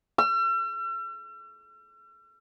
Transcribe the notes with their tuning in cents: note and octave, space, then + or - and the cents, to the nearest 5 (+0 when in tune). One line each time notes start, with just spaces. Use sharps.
E6 +45